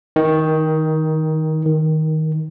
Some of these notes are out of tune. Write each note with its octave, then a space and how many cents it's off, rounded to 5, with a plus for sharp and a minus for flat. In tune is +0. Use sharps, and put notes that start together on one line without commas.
D#3 +15
D#3 +10